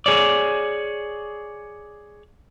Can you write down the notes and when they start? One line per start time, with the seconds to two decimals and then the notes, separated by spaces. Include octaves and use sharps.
0.06 G#4 C#5 D5